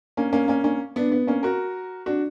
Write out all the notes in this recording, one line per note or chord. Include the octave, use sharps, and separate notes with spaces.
A#3 C#4
A#3 C#4
A#3 C#4
A#3 C#4
B3 D4
B3
A#3 C#4
F#4 A#4
D4 F#4